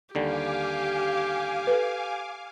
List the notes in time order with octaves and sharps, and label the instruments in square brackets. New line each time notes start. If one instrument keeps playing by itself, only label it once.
[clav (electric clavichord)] D#2 D3 G3 [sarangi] G4 [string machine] F5 G#5 D6
[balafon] A4 B4